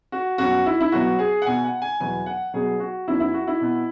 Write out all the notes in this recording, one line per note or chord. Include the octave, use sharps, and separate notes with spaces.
F#4
F#2 F#3 B3 F#4
E4
E4
B2 F#3 B3 F#4
G#4
F#5
B2 B3 G#5
F#5
G#5
E2 B2 F#3 B3 G#5
F#5
B2 F#3 B3 G#4
F#4
F#2 F#3 B3 E4
E4
F#4
E4
B2 B3